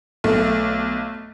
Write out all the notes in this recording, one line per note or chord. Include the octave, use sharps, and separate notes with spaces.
B1 A3